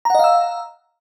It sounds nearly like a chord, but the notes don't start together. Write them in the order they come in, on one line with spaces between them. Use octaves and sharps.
A#5 F#5 D#5 F5 E6